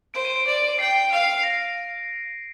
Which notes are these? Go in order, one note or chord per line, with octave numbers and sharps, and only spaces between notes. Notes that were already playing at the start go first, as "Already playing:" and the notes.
C5 D7
D#7
D7
D5
G5 C7
F5
A#6